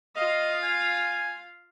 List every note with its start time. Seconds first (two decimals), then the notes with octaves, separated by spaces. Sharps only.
0.16 F4 D#5 F5
0.63 G#5